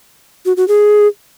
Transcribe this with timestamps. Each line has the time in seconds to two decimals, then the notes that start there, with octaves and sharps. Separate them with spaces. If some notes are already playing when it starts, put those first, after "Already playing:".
0.46 F#4
0.57 F#4
0.68 G#4